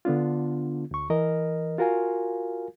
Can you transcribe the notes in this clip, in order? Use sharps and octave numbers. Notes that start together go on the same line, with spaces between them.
D3 B3 D4 F4
D2 C#6
E3 A#4 D#5
F4 F#4 A#4 F5 G#5